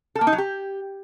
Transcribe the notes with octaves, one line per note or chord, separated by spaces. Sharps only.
A4
A#3
D#4
F#3
G4